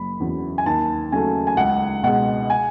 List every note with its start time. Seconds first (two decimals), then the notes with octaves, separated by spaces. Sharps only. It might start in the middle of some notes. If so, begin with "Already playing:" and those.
Already playing: F#1 B5
0.20 E2 C#3 F#3
0.58 G#5
0.66 D#2 A5
1.12 C#3 F#3 A3 G#5
1.47 G#5
1.57 C#2 F#5
2.03 B2 G#3 F#5
2.50 G#5